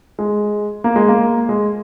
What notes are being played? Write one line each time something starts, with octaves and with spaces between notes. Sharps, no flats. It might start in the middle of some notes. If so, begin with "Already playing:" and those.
G#3
A#3
G#3
A#3
G#3